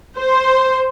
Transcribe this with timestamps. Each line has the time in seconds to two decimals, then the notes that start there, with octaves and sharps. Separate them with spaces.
0.18 C5